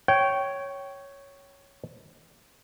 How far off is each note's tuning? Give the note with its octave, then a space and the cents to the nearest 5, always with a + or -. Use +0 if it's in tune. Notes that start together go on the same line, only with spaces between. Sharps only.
C#5 +0 G5 -20